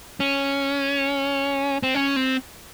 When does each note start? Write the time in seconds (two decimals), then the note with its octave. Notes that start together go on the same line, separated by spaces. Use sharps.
0.20 C#4
1.83 C4
1.95 C#4
2.16 C4